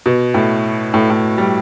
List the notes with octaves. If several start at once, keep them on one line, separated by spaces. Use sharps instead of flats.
B2
A2
A2
A2
G3